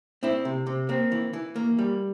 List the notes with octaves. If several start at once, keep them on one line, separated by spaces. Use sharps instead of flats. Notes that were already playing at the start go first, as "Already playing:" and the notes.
C4 E4
C3
C3
A#3 C4
E3
E3
A#3
G3